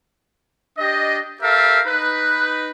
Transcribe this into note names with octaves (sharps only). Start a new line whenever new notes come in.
D4 G4 D#5
G4 A4 A#4 E5 F5
D#4 B4